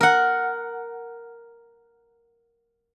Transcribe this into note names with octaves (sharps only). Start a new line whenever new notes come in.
A#4 F#5